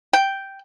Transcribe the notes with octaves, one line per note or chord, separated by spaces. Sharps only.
G5